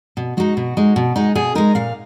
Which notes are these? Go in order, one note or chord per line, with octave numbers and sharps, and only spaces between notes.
B2
G#3 D#4 F#4
B2
G#3 D#4
B2
G#3 D#4
B2 G#4
G#3 D#4 A#4
A#2 F5